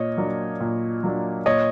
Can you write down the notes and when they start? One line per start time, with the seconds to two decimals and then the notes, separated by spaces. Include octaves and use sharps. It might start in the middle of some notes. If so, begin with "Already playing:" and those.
Already playing: A#2 C#5 D#5
0.17 F#3 A#3 D4
0.60 A#2
1.03 F#3 A#3 D4
1.46 A#2 C#5 D#5